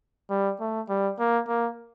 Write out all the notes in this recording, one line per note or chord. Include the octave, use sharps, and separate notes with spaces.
G3
A3
G3
A#3
A#3